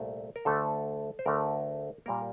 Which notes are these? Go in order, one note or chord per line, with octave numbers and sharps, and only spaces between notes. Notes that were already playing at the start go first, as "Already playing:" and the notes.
Already playing: C2 A#2 A3
A#4
D2 D3 A3 A4
C5
D2 D3 A3 A#4
A#2 G3 A#3 A#4